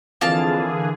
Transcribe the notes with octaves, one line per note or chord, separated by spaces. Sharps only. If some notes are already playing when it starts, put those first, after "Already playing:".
F2 D3 E3 A#3 G#4 F5 A5